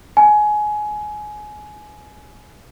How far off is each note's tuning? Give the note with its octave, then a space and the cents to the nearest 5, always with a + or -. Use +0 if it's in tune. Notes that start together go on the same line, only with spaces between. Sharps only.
G#5 +20